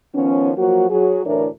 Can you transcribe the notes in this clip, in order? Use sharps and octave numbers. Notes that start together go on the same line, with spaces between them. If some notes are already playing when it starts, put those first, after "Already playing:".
D#3 F3 B3 C#4
F3 F#3 A#3 F#4
F#3 F#4 G#4
D2 A2 E3 D4 A#4 C#5